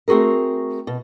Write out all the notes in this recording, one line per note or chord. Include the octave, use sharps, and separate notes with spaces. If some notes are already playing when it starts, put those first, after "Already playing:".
A3 C4 F#4 G#4 A#4
B2